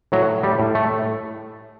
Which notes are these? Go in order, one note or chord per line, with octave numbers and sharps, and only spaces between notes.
A2 F#3
G3
A2
A3